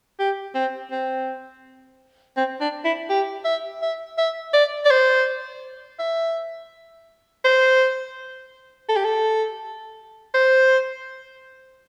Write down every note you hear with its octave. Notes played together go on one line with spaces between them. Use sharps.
G4
C4
C4
C4
D4
E4
G4
E5
E5
E5
D5
D5
C5
E5
C5
A4
G4
A4
C5